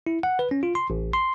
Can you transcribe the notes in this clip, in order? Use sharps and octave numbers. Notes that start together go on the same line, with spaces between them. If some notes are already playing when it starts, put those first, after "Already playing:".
E4
F#5
B4
C#4
F4
C6
A1
C6